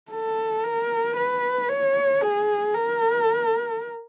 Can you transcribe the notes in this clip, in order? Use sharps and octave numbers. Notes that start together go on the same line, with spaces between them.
A4
A#4
B4
C#5
G#4
A#4